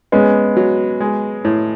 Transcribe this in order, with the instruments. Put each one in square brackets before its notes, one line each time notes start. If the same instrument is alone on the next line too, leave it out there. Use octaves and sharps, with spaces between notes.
[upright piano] G#3 B3 [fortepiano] C#4
[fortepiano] F#3
G#3
A2